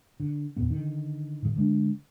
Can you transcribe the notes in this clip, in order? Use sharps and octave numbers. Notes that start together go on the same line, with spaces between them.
D3
F1 E2 A#2 B3
D3 D#3
A2 D#3
D3 G#3 A#3 D4